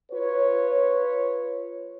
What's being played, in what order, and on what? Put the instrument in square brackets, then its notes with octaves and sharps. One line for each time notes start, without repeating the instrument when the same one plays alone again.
[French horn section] F4 B4 C#5